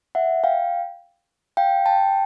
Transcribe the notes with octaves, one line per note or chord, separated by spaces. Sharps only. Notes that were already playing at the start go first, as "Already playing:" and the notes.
E5 F#5
F5 G5
F5 G5
G5 A5